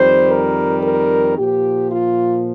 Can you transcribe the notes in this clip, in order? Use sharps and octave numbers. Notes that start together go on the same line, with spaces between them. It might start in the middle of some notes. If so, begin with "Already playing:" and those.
Already playing: F2 D#3 G3 C5
A#4
A#4
A#2 F3 G4
F4